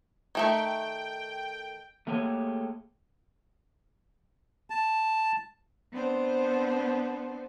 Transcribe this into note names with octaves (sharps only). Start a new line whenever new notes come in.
D#3 A3 E5 G5
A3 A#3 G4 G#4 C5 C#5
A5
B3 C4 D4 C5